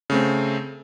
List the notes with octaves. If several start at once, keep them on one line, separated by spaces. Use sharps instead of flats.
C#3 A3 C4